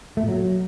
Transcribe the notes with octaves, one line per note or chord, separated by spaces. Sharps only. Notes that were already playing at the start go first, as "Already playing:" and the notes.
A3
A#2
F#3